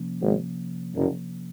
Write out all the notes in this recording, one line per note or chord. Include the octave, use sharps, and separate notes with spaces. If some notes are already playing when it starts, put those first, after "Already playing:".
Already playing: C3 F3 A#3 C#4
G#1 G#2
F#1 F#2